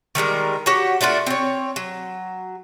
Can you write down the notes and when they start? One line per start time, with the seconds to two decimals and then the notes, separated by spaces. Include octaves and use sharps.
0.15 D#3 G3 G#3 A#4
0.66 F#4 G4 C#5 F#5
1.01 A3 D4 F4 F#4
1.27 C4 C#5
1.76 F#3